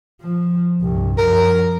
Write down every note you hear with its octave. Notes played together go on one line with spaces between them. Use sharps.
F3
C2 G2
F#2 F3 A#4